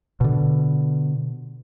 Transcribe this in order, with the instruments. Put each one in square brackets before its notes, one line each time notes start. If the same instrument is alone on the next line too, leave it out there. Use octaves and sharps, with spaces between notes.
[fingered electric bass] B2 D3